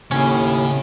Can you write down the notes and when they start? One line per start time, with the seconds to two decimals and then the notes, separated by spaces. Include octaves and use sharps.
0.11 D#2 A2 C#3 C#4